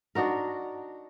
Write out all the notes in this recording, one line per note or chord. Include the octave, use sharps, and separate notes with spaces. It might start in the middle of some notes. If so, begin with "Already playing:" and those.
D4 D#4 F#4 A#4